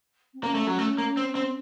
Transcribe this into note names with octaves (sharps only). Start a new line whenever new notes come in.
C4
A#3 C#4
A3
F#3
A3
A#3
C4
C4